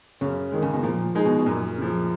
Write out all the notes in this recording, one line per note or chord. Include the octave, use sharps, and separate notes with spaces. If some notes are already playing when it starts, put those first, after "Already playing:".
F#2 C#3
D#3 G#3
C#3
B2
A#2 F3
G#3 D#4 G#4
B2
B2
F#2 A#2
C#3 F3